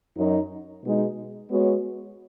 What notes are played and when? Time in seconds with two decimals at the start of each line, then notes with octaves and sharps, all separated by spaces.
0.15 F#2 F#3 D#4
0.83 B2 G#3 D#4
1.49 G#3 B3 F#4 C#5